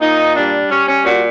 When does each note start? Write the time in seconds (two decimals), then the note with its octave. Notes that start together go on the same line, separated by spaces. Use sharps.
0.01 A#2 D#4
0.36 G3 D4
0.71 G3 C#4
0.88 C#4
1.05 A#2 F#4